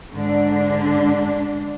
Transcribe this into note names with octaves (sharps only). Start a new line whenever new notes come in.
G#2 D3 D4